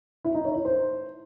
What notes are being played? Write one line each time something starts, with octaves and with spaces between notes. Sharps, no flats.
E4
D#4
C#5
E4
C5